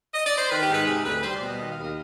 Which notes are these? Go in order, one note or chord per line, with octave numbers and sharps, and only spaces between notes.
D#5
D5
C5
D#3 B4
G4
G#2
B4
C3 G#4
D2 B4
G3 C5
D5
B2
D#5
D#3 D#5
F5
D#2
D#5